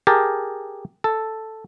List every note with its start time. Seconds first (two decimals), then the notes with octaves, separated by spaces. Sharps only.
0.07 G4 G#4 A#4 A5
1.04 A4